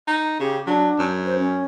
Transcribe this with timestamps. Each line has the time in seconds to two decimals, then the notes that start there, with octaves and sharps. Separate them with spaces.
0.08 D#4
0.40 C#3 G4
0.66 F#3 D4
0.99 F#2
1.26 C5
1.38 C#4